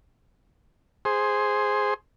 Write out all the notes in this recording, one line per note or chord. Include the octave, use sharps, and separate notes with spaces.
G#4 C5